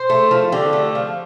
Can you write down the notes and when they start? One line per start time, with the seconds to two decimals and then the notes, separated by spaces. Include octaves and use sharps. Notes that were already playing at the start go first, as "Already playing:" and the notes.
Already playing: C5
0.10 A3
0.31 F3
0.52 D3 G4
0.73 A3
0.95 F3